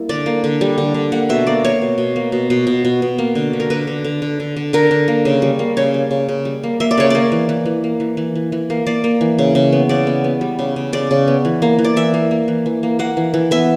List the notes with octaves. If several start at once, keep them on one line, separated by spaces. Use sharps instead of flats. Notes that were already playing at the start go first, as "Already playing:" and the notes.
Already playing: G3 A#3 E4
D3 D5
A#3
D3
G3
D3
D3
A#3 F#5
B2 E5
A#3 D5
A#3 C#5
B2
B2
A#3
B2
B2
B2
B2
B2
A#3
D3
D3
A#4
D3 B4
D3
D3
D3
D3
D3
D3 A#4
D3
A#3
C#3
G3
A#3
C#3 C#5
G3
C#3
C#3
G3
A#3
A#3 E5
D5
C#3 C#5
A#3 D5
E3
E3
E3
A#3
E3
E3
E3
E3
A#3
A#3 D5
A#3
E3
C#3
C#3
B3
C#3 D5
B3
B3
G3
C#3
C#3
C#3 D5
C#3
B3
E3
A#3
E3
D5
E3 E5
A#3
A#3
E3
E3
A#3
A#3 F#5
E3
E3
B3 E5